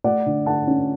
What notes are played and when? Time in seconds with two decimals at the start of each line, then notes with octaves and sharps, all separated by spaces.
0.04 A3 D5 F#5
0.26 D3
0.46 D3 F#5 A5
0.67 C#4